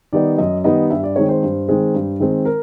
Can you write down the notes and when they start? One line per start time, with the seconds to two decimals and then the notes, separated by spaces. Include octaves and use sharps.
0.13 D#3 G3 B3 D#4 D5
0.38 F#2 D#5
0.64 D#3 G3 B3 D#4 D#5
0.90 G2 E5
1.03 D5
1.16 D#3 G#3 C4 C#5
1.29 C5
1.42 G2
1.68 D#3 G#3 C4
1.94 G2
2.20 D#3 G#3 C4
2.45 A#4